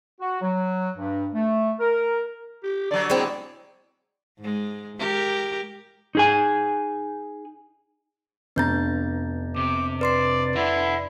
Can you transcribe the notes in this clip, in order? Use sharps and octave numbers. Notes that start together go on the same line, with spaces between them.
F#4
F#3
G2
A3
A#4
G4
D3 F#3 D5
G#3 C4 E4
G#2 G#3
G#3 G4 A#4
D#4 G#4 G#5
F1 B3 D4 A#5 G6 A6
C3 D6
B4 D5 C6 C7
E4 D5 F#5